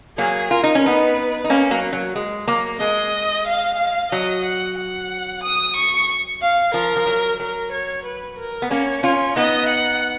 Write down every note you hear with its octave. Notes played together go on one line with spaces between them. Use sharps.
F#3 A#3 G#4
F4 A#4
D#4
C#4
B3 D#4 B4
D#4
A#3 C#4
F#3 A#3
F#3
G#3
F#3 A#3
G#3 D#5
F5
F#3 D#5
F#5
F#5
D#6
C#6
F5
F3 A#4
F3
F#3
F#3 A#4
C#5
B4
A#4
B3
A#3 C#4 C#5
C#4 F4
B3 D#4 D#5
F#5